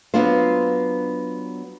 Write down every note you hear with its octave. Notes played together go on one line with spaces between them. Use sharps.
F#3 B3 D4 F4 C5